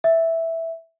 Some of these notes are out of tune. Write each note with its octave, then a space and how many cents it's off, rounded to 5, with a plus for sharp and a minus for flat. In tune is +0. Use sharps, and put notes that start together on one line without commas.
E5 -5